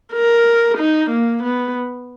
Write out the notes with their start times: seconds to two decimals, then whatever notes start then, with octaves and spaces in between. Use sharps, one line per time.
0.13 A#4
0.78 D#4
1.10 A#3
1.43 B3